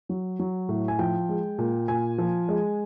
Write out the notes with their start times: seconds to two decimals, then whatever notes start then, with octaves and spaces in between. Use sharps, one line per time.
0.09 F#3
0.39 F#3
0.69 A2
0.88 G#5
0.99 F3 G5
1.29 G#3
1.58 A#2
1.88 A#2 G#5
2.18 F3
2.49 G#3